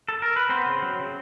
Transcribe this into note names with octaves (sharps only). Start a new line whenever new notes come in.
A4
A#4
B4
B3 C4 C5
C#3
F#3
C#3